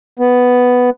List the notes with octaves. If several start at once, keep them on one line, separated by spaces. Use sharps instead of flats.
B3